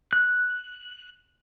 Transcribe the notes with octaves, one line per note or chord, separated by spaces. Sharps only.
F#6